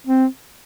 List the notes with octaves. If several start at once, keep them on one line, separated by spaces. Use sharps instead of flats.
C4